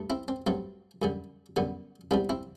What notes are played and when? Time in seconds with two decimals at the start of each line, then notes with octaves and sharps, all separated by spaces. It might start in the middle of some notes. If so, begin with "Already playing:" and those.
Already playing: G2 A3
0.10 C4 E4
0.28 C4
0.47 G2 F#3 A3 C4
1.02 F#2 D3 G3
1.56 F#2 D3 G3 B3
2.11 C2 C3 G3 B3 D4
2.29 C4 E4